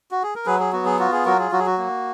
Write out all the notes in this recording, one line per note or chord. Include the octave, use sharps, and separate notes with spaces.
F#4
G#4
A#4
F#3 G#4 B4
G#4
B3 F#4
G#4
F4 F#4
G#4
F#3 F#4 A#4
G#4
F#3 F#4
G#4
F#4
A#3